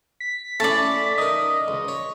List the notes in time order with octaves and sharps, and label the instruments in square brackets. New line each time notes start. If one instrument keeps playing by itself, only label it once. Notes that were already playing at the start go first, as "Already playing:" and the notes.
[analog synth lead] B6
[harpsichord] A3 C#4 E4 [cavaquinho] D5 A5
[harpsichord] D#4 A#4 [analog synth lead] D#5
[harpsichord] C#2
C#5